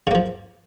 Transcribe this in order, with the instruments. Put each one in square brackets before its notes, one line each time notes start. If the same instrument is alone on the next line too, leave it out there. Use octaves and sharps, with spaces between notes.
[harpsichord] C#3
A#3
F3